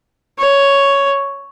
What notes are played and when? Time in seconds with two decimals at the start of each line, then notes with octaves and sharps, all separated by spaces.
0.39 C#5